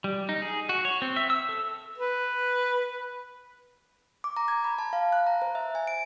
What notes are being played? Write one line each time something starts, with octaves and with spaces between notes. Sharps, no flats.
G3
D#4
G#4
F#4
C#5
C4
E5
E6
A4
B4
D6
A#5
G#6
B5
A5
F5
F#6
A#5
C5
E5
G#5
D7